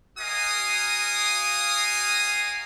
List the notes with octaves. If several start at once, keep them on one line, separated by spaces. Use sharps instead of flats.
F#4 A#4 D#5 F5 G#5 D#6